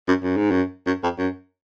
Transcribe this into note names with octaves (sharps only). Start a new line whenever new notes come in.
F#2
F#2
G#2
F#2
F#2
F2
F#2